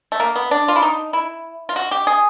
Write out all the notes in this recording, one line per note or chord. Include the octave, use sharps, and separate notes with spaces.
A3
A#3
B3
D4
F4
E4
D#4
E4
F4
F#4
G4
G#4